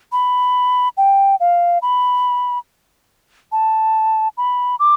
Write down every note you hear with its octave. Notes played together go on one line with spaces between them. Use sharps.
B5
G5
F5
B5
A5
B5
D6